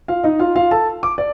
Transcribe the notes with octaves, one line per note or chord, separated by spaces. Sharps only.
F4 F5
D#4 D#5
F4 F5
F4 F5
A4 A5
D6
D5